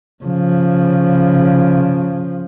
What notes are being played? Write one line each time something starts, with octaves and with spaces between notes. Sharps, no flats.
C#3 F3